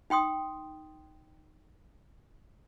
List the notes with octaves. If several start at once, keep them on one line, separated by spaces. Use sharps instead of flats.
D#4 G5 C6 D#6